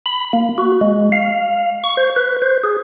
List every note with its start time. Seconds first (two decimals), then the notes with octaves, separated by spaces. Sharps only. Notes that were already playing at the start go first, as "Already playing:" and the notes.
0.06 B5
0.33 A#3
0.58 F#4
0.81 G#3
1.12 F5
1.84 C#6
1.97 C5
2.16 B4
2.42 C5
2.64 G#4